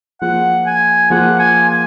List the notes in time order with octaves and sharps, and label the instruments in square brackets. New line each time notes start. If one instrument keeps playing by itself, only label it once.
[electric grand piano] F3 A#3 F4 G#4 [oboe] F#5
[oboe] G#5
[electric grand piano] F3 A#3 F4 G#4 [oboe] F#5
[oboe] G#5
G#5